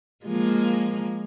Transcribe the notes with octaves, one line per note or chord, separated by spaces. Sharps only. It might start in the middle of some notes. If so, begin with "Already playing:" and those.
F3 G#3 A#3